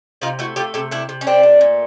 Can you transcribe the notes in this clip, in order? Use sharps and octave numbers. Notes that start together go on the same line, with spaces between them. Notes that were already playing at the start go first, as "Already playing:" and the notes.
C3 D#4 F4
A3 E4 F#4
A3 F4 G4
C3 G4 A4
C3 D4 E4
C3
C#4
C3 C4 D4
A3
A#2